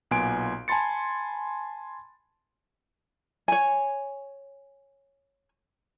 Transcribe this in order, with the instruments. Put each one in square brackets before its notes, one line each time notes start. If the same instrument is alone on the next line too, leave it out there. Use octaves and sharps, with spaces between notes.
[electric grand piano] B1 A#2 B3 G#5 C6 D7
G#5 A5 B5 C6 A6 C#7
[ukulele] C#5 G#5